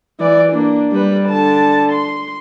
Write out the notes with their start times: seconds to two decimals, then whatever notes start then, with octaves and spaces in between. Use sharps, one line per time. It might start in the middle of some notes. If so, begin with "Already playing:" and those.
0.20 E3 D5
0.53 A#3 D4
0.92 G3 B4
1.28 D3 A5
1.93 C6